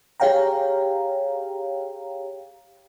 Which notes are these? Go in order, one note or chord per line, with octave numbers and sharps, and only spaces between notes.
G4 G#4 C#5 F5 G5 A#5